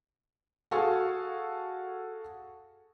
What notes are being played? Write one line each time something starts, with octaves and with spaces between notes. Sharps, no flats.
F#4 G#4 A4 F5 G#5 C#6